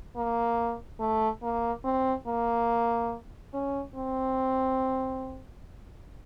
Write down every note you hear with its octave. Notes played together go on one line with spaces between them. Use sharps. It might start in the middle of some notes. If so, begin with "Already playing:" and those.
A#3
A3
A#3
C4
A#3
C#4
C4